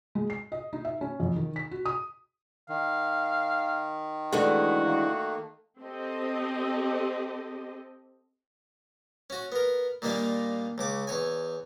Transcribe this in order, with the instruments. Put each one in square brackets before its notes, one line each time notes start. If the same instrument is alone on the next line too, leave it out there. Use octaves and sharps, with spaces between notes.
[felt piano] G#3
C7
D#5
D#4
E5
C#4
F2
D#3
B6
F#4
D#6
[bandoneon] D#3 [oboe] F5
[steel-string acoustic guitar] D3 E3 G#3 [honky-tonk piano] A3 [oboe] F#4
[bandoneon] D#3 A#3
[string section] C4 G4 A4 D#5
[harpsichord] C#4 F#4
B3 A#4
A#2 D#3 G3 A#3 D4 F4
C#2 C#3 D6
E2 C#5 G#5